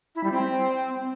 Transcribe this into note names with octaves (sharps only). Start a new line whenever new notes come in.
E4
G3
C4